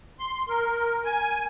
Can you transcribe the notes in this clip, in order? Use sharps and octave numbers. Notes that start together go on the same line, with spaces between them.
C6
A#4
G#5